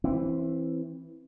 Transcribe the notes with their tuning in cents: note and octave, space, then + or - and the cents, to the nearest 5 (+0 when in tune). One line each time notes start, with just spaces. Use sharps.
E3 +0 C4 +20